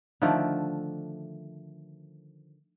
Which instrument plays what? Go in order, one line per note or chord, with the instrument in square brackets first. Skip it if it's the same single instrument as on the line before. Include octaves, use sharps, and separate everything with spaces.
[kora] D3 D#3 F3 A3